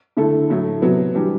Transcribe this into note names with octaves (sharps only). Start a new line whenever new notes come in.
D3 A3 E4 A4
A2 F#3 A3 E4
C3 F#3 B3
E3 G3 D4 G4